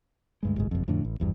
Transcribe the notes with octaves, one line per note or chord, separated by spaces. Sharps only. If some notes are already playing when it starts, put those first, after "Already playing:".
D2 G2 G#3
G1 C2 G#2
F#1 B1 F2
F2 A2 D3
A1
G#1 E2 G2